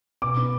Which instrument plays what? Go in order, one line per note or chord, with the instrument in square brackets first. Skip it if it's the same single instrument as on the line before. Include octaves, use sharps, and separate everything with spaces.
[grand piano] B2 D6
B3